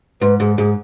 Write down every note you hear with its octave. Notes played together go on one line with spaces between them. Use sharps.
G#2 B4
G#2 G#4
G#2 G#4